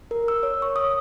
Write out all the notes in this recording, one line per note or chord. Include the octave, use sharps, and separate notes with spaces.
A#4
E6
C#5
C#6
D#6